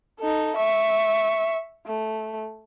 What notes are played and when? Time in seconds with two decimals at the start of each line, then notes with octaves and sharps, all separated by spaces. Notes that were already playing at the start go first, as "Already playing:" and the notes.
0.19 D#4 A4
0.56 E5 C#6
1.86 A3